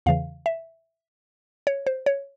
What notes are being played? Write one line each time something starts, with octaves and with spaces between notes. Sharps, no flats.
E2 C#3 E3 F5
E5
C#5
C5
C#5